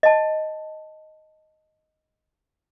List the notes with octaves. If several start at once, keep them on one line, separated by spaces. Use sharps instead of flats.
D#5 A5